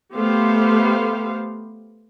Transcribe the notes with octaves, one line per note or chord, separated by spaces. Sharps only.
A3 B3 G4 C5 F5